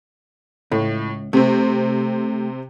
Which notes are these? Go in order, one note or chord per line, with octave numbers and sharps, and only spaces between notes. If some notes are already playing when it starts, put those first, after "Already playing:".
C#2 A2
C3 A3 C4